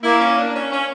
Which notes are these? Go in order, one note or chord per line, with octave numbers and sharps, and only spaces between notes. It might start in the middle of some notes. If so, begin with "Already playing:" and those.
A#3 E4
C#4
D4
C#4
C#4